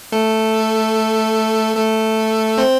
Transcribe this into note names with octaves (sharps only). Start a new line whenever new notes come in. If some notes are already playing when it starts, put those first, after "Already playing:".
A3 A4
A3 A4
C4 C5